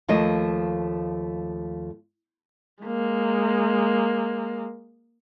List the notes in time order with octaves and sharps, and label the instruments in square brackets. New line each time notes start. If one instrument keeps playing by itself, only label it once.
[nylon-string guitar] D#2 F3 A3 D#5
[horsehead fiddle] G#3 A#3